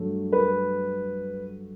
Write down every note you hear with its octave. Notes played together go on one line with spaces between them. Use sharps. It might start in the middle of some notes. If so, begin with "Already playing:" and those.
Already playing: G2 F#3 A3
B4